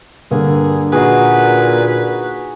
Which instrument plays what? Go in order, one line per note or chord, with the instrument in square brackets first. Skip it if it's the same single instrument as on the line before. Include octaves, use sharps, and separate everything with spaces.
[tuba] G2 [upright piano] D3 A#3 [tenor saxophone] G#4
[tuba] A#2 [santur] D#4 F#4 G#4 [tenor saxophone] B4